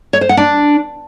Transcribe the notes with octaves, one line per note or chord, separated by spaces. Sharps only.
C#5
C5
F#5
D4